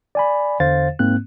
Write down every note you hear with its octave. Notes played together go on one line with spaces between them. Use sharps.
D5 G#5 B5
E2 D3 C5 F5 A6
G#2 A#3 C4 F#6